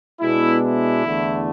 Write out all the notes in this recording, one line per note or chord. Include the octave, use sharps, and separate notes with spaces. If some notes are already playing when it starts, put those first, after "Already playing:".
B2 G#3 B3 D4 E4
E4
E2 D3 A3